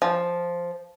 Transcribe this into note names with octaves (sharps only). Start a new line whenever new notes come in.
F3